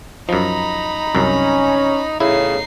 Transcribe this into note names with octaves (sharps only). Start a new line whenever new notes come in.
F#2 F3 D#4 A#5 B5
C2 F#2 C#4
A1 E2 A2 C#3 D#4 E4 C7